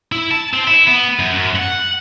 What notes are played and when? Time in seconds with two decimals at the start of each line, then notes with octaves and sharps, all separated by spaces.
0.12 E4
0.31 A5
0.53 C4
0.67 E4
0.87 B3
1.19 F#2
1.33 F#2
1.56 F#5